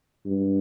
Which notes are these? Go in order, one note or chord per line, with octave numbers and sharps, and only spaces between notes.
G2